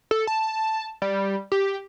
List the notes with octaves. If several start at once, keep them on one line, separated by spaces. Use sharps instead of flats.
A4
A5
G3
G4